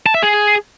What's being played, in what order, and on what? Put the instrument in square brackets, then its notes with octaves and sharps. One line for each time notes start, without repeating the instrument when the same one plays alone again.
[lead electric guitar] A5
E5
G#4